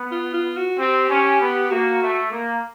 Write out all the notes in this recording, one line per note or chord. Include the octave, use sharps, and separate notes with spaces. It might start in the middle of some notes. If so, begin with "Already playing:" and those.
Already playing: B3
F4
F4
F#4
C4 G4
C#4
B3
A#3 F#4
A3
A#3